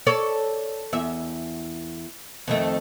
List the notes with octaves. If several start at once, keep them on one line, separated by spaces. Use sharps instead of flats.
A4 C#5 D5
E2 E5
F2 D#3 A3